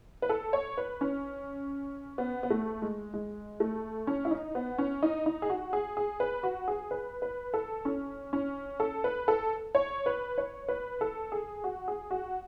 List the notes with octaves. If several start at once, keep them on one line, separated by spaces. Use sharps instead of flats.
B4
A4
C#5
B4
C#4
B3
B3
A3
G#3
G#3
A3
C#4
E4
D#4
B3
C#4
D#4
D#4
G#4
F#4
G#4
G#4
B4
F#4
G#4
B4
B4
A4
C#4
C#4
A4
B4
A4
C#5
B4
C#5
B4
A4
G#4
F#4
G#4
F#4